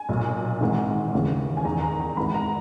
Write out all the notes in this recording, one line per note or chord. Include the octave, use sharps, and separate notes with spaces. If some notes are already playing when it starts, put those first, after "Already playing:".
Already playing: G#5
B1 A#2
G#1 G#2 E3
D#2 C#3 E3
G#5
E2 D#3 A#5
A#5
A#5
G#1 G#2 E3 B5
A#5